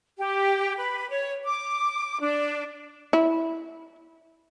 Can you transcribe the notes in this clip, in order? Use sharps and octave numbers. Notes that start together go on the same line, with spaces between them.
G4
B4
C#5
D6
D4
E4